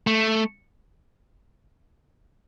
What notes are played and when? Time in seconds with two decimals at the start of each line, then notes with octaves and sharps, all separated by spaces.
0.07 A3